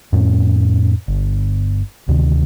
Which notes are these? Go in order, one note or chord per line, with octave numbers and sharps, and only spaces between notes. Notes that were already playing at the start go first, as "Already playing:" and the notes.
F2 A2 C4 C#4
G1
D2 C3 D#3